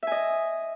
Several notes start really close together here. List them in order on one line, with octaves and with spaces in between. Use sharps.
E5 G#5 D#5